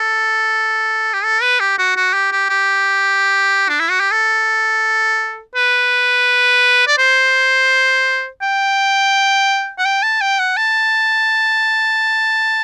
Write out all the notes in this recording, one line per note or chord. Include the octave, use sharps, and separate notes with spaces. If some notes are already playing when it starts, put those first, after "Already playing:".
Already playing: A4
G4
A4
B4
G4
F#4
F#4
G4
G4
G4
D4
E4
F#4
G4
A4
B4
D5
C5
G5
F#5
G5
A5
G5
F#5
A5